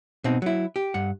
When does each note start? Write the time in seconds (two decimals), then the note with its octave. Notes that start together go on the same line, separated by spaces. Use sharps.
0.24 B2 C4 D#4
0.42 F#3 E4
0.76 G4
0.94 G2 F#5